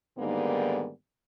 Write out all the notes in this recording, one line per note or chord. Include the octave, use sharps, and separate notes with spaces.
G#2 D3 D#3 G3 A#3 B3